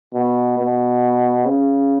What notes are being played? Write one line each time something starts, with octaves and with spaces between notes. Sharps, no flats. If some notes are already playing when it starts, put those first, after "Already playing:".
B2
B2
C#3